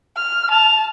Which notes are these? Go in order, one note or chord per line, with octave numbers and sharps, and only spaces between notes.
F6
A5 F7